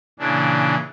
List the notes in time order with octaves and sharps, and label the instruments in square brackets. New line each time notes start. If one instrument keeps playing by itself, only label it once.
[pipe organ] A#2 C#3 E3 D4